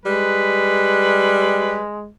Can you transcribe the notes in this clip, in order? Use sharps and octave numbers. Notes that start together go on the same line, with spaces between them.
G3 G#3 B4